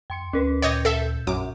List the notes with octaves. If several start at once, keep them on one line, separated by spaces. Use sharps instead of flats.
F2 G5 C6 C#7
D2 C#4 A#4 B4
A#2 C#5 D#5 G5 G6 A6
A4 E5
A#1 F#2 E5 D6